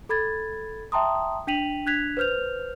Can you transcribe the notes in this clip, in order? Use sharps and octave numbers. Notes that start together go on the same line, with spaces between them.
A4 B5 G#6 A6
E5 G5 A5 A#5 C6 D#6
D4 G5 B6 D#7 F7 F#7
D4 F#6 G#6 B6 F7
B4 C5 F6 G6 F7